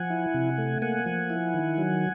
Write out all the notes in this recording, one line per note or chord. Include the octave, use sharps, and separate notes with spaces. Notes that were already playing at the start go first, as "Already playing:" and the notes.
Already playing: F3 F#5 G#5
E4
C3
A3
A#3 F#5 G#5
F3
E4
D#3
F#3